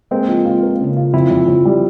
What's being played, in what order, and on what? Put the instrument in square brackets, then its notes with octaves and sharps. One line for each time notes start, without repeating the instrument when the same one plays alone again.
[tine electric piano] G#3 C4 [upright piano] A#3
[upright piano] F3
F4
A#3
C#3
F4
[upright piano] F2 [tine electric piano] C4 E4
[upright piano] F2
F2
G3